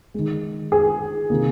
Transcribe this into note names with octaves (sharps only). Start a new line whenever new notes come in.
D#3 G#3
G#4
C3 D#3 A#3